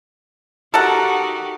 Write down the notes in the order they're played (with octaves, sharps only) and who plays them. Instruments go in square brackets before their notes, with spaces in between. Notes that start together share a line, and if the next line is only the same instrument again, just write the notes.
[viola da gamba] D#4 F#4 G4 [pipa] A4 A#4 F#5